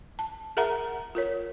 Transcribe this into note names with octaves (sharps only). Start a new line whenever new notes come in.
A5
G#4 A#4 E5 F#5 A#5
F4 A#4 C#5